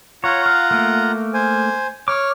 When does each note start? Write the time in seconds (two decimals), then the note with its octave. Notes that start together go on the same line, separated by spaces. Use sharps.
0.24 F4 C#5 F#5 A#5
0.46 F5
0.71 A3 A#3
1.34 C5 G#5
2.08 C#5 D6 F6